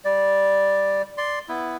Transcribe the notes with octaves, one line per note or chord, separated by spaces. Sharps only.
G3 D5
D5 C6
B3 E4